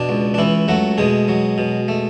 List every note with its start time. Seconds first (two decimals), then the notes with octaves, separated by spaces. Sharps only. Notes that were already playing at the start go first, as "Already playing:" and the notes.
Already playing: B2 D4
0.09 C#2
0.34 D4
0.38 C#2 E3 E4
0.68 F#3 A3 F#4
0.98 B2 G#3 G#4
1.28 F#3
1.58 B2
1.88 A3